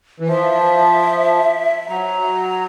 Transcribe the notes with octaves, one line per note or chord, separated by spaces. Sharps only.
E3
F3 E5
F#3 A#5